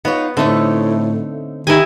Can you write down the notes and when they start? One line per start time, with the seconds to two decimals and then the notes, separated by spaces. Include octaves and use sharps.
0.05 B3 D#4 F4 C#5
0.37 A2 D3 A3 C4 D#4 C#5
1.67 D#3 E4 G4 D#5 G#5